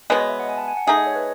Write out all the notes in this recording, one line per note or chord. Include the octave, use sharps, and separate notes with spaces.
B2 G#3 B3 C#5
D#5
E5
F#5
G#5
A5
G#5
F#5
A3 D#4 G#4 E5
D#5
C#5
B4